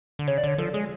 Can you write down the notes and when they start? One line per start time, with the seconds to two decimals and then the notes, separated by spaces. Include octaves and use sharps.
0.19 D3
0.28 C#3 C#5
0.38 D5
0.44 D3 C#5
0.58 F3 A4
0.74 G#3 G#4